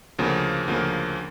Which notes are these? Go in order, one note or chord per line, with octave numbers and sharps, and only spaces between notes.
D2 C#3 F3 A#3
D2 C#3 F3 A#3